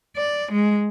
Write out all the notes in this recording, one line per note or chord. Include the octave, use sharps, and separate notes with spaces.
D5
G#3